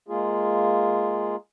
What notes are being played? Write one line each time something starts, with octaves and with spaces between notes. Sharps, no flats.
G#3 A#3 F4 G#4